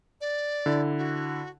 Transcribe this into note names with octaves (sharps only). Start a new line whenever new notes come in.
D5
D3 E4
F#4